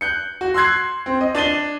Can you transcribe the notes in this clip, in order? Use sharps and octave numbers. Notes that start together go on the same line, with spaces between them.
F#6 G6 C#7
F#4
C6 E6 F#6 G#6 C7
C4
D#5
D4 A6 D#7 G7